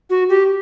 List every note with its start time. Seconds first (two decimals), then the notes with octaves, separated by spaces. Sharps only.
0.10 F#4
0.29 G4